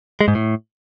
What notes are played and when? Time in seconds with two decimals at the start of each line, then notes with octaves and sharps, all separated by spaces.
0.21 G#3
0.28 G#2
0.35 A2